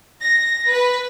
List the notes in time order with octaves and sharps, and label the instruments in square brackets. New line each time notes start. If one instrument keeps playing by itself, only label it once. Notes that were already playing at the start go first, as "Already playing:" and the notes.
[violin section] A#6
B4